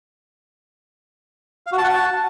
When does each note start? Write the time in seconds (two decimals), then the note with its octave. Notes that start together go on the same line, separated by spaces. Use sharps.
1.66 F5
1.72 F#4
1.78 A5
1.84 F#5
1.89 A5